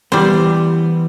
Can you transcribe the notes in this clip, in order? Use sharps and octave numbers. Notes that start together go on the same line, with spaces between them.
E3 G3 B3 C5